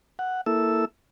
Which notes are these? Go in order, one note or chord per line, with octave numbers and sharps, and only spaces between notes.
F#5
A#3 E4 A4 E6